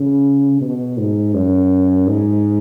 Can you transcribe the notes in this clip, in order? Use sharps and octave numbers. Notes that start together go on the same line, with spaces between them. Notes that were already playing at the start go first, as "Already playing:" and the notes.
Already playing: C#3
B2
G#2
F#2
G#2